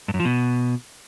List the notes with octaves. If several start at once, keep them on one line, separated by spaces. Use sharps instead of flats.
G2
F#2
F3
B2